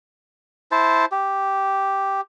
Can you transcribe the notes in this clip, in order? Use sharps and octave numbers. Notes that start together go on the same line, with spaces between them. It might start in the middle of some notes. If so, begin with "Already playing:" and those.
E4 C5 A5
G4